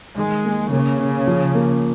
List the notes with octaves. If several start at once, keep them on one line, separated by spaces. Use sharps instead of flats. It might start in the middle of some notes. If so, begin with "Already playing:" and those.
D#3 G#3
A#3
C#3 A#3
C#4
F3
A#3